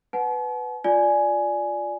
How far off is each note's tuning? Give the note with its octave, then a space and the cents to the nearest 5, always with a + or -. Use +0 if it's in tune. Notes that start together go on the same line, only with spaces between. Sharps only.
B4 +10 F#5 +0 A5 -45
F4 +10 D5 +0 G#5 +10